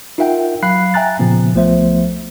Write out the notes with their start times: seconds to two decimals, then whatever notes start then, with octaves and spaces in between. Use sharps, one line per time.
0.18 D#4 F4 A#4 E5 F#5 G5
0.63 F#3 F5 B5 F#6 C7
0.94 E5 G5 G#5 A#5 F#6 A6
1.19 A#2 C#3 F3 B3
1.54 C2 F3 A3 B3 C5 E5